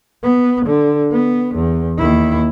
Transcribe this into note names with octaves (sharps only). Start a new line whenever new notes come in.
B3
D3
B3
E2
D#2 E4